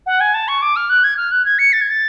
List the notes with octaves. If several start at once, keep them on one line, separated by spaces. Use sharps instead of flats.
F#5
G#5
A5
C#6
D6
F6
F#6
G#6
F6
F#6
G#6
C#7
A6
G#6
A6